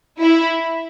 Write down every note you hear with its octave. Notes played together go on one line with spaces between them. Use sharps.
E4